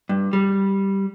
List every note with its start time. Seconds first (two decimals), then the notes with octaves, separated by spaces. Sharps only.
0.09 G2
0.33 G3